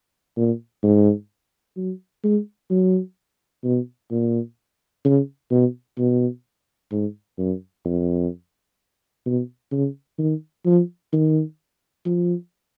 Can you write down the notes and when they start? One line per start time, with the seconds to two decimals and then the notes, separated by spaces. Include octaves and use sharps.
0.37 A#2
0.83 G#2
1.77 F#3
2.24 G#3
2.70 F#3
3.64 B2
4.11 A#2
5.05 C#3
5.51 B2
5.98 B2
6.92 G#2
7.39 F#2
7.85 F2
9.26 B2
9.72 C#3
10.19 D#3
10.66 F3
11.13 D#3
12.06 F3